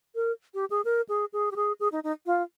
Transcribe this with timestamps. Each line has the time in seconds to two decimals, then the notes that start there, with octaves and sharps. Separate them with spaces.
0.15 A#4
0.54 G4
0.70 G#4
0.85 A#4
1.09 G#4
1.33 G#4
1.51 G4
1.56 G#4
1.80 G#4
1.92 D#4
2.04 D#4
2.26 F4